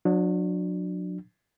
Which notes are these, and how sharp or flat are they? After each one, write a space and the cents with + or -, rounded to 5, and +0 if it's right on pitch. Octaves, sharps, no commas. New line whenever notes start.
F#3 -30 D4 +15